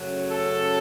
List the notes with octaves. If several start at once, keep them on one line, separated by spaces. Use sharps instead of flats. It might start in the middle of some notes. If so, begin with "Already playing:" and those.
Already playing: F#2 C#3 F#3 A3
A4